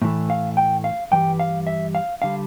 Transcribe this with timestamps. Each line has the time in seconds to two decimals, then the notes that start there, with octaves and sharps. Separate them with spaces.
0.02 A2 E3 A3
0.30 F5
0.57 G5
0.84 F5
1.11 G2 E3 G3 G5
1.40 F5
1.67 E5
1.95 F5
2.22 D3 G3 F5